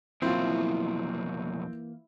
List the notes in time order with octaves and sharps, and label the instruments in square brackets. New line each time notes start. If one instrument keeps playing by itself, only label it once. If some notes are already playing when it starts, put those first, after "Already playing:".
[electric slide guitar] F2 B2 F#3 [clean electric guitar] E3 A#3 [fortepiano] C4 F4 [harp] E4